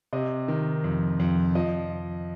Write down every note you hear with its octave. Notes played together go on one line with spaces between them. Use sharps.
C3 D#5
D#3
F2
F2
F3 D#5